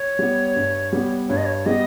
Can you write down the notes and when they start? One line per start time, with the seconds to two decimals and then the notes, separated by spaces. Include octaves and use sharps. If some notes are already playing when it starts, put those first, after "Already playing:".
Already playing: C#5
0.19 G3 B3
0.56 G2
0.93 G3 B3
1.29 G2 C#5
1.37 D#5
1.45 C#5
1.66 G3 B3 D#5